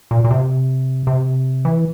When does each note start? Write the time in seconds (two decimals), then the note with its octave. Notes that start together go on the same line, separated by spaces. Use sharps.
0.11 A#2
0.24 A#2
0.31 C3
1.07 C3
1.65 E3